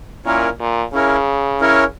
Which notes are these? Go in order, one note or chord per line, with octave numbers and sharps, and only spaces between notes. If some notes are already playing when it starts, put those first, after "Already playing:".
A#2 C#4 E4 A#4 C#5
A#2
C#3 C#4 E4 A#4 C#5
C#4 E4 A#4 C#5